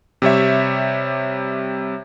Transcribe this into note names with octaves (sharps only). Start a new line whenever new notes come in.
C3 G3 C#5 E5